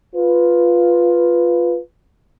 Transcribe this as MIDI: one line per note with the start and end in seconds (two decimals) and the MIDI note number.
0.14 1.79 65
0.14 1.79 71